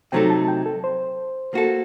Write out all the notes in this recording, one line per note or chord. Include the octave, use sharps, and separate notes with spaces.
C3 F#3 A3 D#4 A4 G5
A5
G5
A4
C5
A#3 F#4 A4